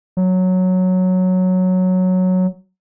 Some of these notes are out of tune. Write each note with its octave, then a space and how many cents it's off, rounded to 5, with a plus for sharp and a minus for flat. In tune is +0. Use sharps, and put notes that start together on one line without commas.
F#3 -5